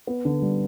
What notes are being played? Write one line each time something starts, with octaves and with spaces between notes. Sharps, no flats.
B3
D3
G3